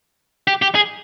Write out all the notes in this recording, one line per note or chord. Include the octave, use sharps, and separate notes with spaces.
G4
G4
G#4